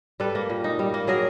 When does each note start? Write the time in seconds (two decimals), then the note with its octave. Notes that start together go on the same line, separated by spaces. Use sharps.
0.20 G3 A4 B4
0.35 A#3
0.50 A#2
0.64 D#4
0.79 G3
0.94 A#3
1.07 F#3 G#4 A#4